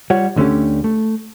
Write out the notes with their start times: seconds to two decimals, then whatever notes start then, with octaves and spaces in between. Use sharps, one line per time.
0.10 G3 F4 C#5 F#5
0.36 D2 D3 A3 C#4 G4
0.84 A3